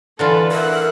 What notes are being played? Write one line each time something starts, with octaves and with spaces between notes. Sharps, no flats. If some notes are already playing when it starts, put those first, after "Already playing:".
D3 E3 F4 A4 B4
A#4 E5 F#5 F#6